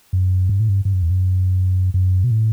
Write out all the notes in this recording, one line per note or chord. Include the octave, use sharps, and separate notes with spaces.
F#2
G2
A2
G2
G2
F#2
E2
F#2
F#2
B2
A2